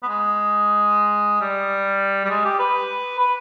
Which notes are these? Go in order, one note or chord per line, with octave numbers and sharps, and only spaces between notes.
B3
G#3
G3
G3
G#3
G4
B4
B4